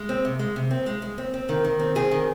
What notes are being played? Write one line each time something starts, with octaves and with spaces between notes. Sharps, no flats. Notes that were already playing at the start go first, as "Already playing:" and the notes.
Already playing: G#3
C4
C3
G#3
C3
C4
G#3
G#3
C4
C4
D#3
D#3
C4
C4 G#4
D#3